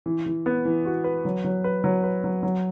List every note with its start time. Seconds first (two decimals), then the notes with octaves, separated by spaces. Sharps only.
0.06 E3
0.26 E3
0.46 B3
0.65 E3
0.85 F#4
1.04 B4
1.25 F#3
1.44 F#3
1.64 B4
1.84 F#3
2.04 B4
2.24 F#3
2.43 F#3